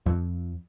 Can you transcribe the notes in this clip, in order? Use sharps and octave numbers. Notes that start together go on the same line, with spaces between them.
F2